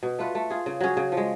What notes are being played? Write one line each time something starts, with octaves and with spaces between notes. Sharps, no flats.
B2
A3 F4 B4
A3
F4 G#4
C#3
F#3 C#4 G#4
C#3
F3
G#3